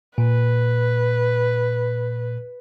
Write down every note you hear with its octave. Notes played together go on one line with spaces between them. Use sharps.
A#2 B4